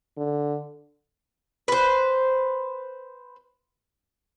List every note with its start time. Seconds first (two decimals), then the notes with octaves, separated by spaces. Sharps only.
0.17 D3
1.68 B4 C5